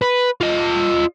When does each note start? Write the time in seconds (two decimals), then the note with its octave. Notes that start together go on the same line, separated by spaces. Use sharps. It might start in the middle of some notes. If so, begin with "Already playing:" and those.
0.02 B4
0.41 F4 D#5